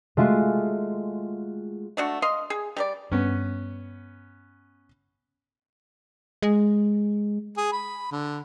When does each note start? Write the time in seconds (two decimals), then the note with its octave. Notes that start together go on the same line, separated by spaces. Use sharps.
0.17 G#3 A3 F4 F#4
1.97 A3 D4 F#4
2.22 D#5 F5 C6
2.50 G#4
2.76 G3 A#4 D5
3.12 G2 B3 C#4
6.42 G#3
7.57 G#4
7.72 B5
8.11 D3